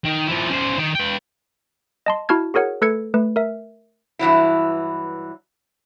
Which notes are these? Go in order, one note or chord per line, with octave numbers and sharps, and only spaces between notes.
D#3
F3 E4
C#3 C5
D#3
B4 G5
D#5 A5 C6
E4 F#4 A5 F6 G#6
F#4 G#4 A#4 C#5 F#5
A3 A4 B4 E6 G#6 C#7
A3 B4
A#4 E5
G2 E3 F#3 E4